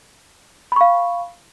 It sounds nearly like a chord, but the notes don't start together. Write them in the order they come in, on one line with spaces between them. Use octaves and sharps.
B5 C#6 F5